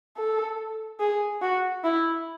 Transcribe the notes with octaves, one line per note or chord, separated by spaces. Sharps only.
A4
G#4
F#4
E4